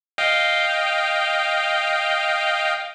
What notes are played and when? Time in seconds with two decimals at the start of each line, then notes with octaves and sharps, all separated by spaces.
0.18 D#5 F5 G5